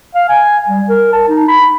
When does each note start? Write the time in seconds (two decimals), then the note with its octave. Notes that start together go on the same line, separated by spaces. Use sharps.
0.15 F5
0.29 G#5
0.68 G3
0.89 A#4
1.13 A5
1.29 D#4
1.48 B5